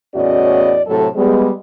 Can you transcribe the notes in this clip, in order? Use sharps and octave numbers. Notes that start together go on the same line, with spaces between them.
E2 A2 C#4 F#4 D5 D#5
A2 C3 F#3 A4
G3 G#3 B3